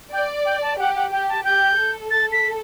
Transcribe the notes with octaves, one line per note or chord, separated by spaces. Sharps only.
D5 G5
G5
A5
G4 F#5
F#5
G4 G5
A5
G4 G6
A4
A6
B6